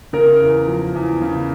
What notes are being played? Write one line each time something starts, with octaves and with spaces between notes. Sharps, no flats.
C#3 A#4
E2
F3
E2
C#3